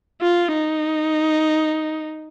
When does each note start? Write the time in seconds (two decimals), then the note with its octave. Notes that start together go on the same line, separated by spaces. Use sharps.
0.22 F4
0.53 D#4